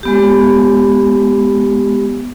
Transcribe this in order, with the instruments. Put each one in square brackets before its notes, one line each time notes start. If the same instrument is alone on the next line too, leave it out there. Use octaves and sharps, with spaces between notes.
[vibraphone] G#3 B3 G4